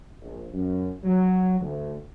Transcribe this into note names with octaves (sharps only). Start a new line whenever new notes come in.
A#1
F#2
F#3
D2